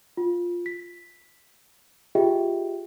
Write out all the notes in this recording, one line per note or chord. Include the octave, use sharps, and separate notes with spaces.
F4
B6
F4 G4 G#4 D#5 E5 G5